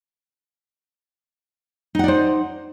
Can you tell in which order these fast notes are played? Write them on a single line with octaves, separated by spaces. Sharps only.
D#4 F#5 D5 C5